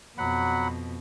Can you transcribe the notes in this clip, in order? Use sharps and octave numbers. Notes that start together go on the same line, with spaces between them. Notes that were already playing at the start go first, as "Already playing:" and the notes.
F2 B2 F#3 F#5 B5